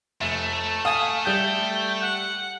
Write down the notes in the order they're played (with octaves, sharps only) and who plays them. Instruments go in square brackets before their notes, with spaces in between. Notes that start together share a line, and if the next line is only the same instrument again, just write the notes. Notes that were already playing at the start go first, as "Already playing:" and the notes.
[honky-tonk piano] F1 [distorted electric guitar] A3
[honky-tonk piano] F5 G#5 [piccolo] D#6
[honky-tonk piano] G3 G6 [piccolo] G5
[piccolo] F#5